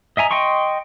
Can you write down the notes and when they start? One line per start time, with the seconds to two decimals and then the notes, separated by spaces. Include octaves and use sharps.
0.17 D#5 E5 G#5 A#5
0.31 D#5 G5 C6 C#6